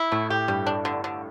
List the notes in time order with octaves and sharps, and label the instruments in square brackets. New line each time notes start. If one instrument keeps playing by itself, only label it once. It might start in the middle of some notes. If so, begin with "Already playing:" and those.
Already playing: [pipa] E4
[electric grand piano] A2 [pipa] A3
[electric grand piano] A2 [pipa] G4
[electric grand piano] G2 [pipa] G3
[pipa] D4
D3
D3